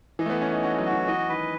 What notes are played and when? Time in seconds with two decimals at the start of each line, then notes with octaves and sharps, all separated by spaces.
0.19 E3 D#5
0.26 A3
0.30 B3
0.41 C#4 D#5
0.52 D#4
0.63 C#4 F#4
0.78 F#3
0.86 F#4
0.93 E3
1.07 E3 D#5
1.29 D#3 B4